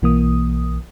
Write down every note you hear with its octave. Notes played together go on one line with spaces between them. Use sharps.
B1 E3 A#3 D#6